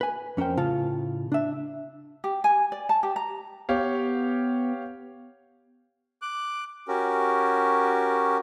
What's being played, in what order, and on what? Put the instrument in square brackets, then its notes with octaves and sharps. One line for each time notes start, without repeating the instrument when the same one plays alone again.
[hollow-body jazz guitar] B4 G#5
F2 C#4 A#4 C5 G5
A2 C#3 F4 F5 A5
D4 E5
[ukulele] G4
G#5
D5
A5
G4
A#5
[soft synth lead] B3 [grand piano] G4 C#5 F5
[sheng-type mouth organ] D6 F#6
C#4 F#4 G4 A#4